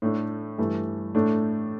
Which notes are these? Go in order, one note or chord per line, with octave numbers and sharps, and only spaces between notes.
A2 A3 D4
G2 E3 A3
A2 A3 D4